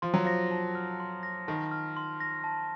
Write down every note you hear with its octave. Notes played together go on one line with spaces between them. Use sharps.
F3 C6
F#3
F3 A#6
A5
F6
C6
A#6
D#3 A5
F6
C6
A#6
A5